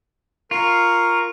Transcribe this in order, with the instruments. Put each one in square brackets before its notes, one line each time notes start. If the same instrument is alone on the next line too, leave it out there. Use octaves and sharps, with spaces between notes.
[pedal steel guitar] F4 [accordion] A#4 C#6